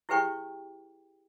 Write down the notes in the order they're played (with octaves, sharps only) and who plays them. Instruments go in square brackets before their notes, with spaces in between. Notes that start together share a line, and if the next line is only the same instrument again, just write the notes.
[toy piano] E4 G4 G#4 B4 G5 C#6